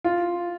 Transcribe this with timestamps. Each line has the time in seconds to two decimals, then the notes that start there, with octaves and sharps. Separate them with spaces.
0.04 F4